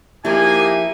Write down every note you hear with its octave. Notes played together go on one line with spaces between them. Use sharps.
F3 A#3 D#4 E4 G4 G#4 G#5